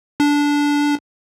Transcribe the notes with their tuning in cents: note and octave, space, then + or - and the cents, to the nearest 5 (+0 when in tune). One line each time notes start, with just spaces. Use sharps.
D4 -15